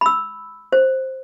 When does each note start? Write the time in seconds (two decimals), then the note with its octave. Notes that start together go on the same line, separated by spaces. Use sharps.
0.01 B5 E6
0.72 C5